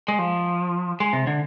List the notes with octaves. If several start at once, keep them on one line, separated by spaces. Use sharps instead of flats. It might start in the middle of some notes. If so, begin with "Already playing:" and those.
G#3
F3
G#3
C3
D3